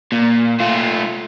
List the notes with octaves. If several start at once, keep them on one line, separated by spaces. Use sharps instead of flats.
A#2
A3 F4